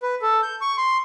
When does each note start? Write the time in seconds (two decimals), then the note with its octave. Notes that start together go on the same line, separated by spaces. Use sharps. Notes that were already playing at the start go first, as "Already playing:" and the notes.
0.03 B4
0.22 A4
0.42 G6
0.61 C#6
0.77 C6